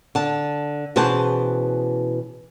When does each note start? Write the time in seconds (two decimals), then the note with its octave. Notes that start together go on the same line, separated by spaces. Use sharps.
0.15 D3 A5
0.96 B2 E3 C#4 G#4 C5 A5